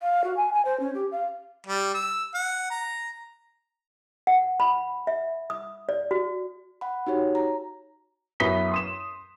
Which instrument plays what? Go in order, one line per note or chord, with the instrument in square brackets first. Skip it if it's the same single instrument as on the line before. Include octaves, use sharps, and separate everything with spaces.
[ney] F5
F#4
G#5
G#5
C5
C#4
G4
F5
[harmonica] G3
E6
F#5
A#5
[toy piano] F#5
B5
E5
D#6
D5
F#4
[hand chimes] F#5 B5
D#4 F#4 G4 C#5
A#5
[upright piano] F#2 B3 E4 D#6 B6 G7
C6 D#6 E7